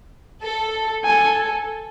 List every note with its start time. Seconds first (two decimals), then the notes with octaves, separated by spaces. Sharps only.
0.42 A4
1.04 A4 G#5